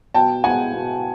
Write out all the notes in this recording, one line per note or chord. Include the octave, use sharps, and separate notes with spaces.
B2 G5 A5
G#3 B3 F#5 G#5
B2